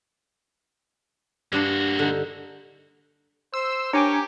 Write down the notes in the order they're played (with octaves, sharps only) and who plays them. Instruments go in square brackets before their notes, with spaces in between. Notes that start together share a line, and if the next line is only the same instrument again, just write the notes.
[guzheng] G2 D4 C6 [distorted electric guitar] A#3 F#4
[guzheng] D3 D#4
[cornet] C5 [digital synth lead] E6
[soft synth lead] D4 [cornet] G4 [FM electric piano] A#4 G#5 D6 [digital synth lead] C#5